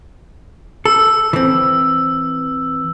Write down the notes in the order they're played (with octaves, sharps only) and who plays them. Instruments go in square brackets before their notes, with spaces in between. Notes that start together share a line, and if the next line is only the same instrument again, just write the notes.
[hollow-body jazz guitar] A4 [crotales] E6
[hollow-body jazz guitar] E3 C4